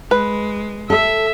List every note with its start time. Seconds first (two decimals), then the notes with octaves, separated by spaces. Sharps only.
0.11 G#3 B4
0.90 A4 E5